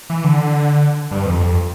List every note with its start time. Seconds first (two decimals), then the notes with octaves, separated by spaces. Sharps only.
0.10 E3
0.24 D3
1.11 G2
1.26 F2
1.39 F2